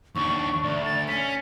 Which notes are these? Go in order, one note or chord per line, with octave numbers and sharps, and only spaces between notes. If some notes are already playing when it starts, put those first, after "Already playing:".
D#2 D4 C#6
D2 D5
A6
C#4 B6